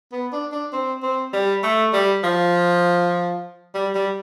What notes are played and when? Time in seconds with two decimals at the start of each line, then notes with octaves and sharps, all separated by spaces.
0.12 B3
0.33 D4
0.52 D4
0.73 C4
1.03 C4
1.33 G3
1.63 A3
1.93 G3
2.23 F3
3.74 G3
3.95 G3